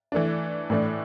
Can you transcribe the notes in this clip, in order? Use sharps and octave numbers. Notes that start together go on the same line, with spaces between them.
E3 A3 D4
A2 E3 A3 D4